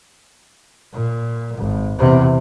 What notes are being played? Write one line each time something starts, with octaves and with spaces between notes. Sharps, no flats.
A#2
G#1
E2 C3